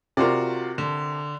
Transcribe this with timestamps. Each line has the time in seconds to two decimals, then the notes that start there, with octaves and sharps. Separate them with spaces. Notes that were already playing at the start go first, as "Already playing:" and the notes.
0.17 C3 F4 F#4 A#4 D5
0.78 D3